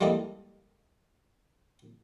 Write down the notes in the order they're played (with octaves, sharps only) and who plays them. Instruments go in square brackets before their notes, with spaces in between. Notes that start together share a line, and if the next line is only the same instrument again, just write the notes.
[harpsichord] G3 G#3 A#3 E4 A4 D#5